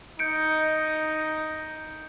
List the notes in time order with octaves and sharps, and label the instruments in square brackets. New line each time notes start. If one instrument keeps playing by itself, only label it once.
[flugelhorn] D#4 [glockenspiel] G6 C#7 D7